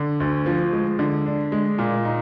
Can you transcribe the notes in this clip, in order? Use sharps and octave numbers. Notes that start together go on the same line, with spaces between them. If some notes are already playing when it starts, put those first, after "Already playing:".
Already playing: D3
D2
F3
G#3
D3
D4
G#3
A#2
D#4